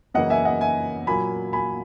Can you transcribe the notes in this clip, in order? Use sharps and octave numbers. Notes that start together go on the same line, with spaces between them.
F#2 C#3 E3 A#3 D#5 F#5
E5 G#5
D#5 F#5
E5 G#5
A#2 F#3 A#3 G#5 B5
G#5 B5